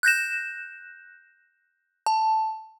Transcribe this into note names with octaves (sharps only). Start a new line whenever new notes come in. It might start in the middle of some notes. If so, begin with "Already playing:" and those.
F#6 G6 A#6 E7
A5